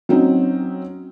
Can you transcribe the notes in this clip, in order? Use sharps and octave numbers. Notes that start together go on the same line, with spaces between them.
F#3 C4 C#4 D#4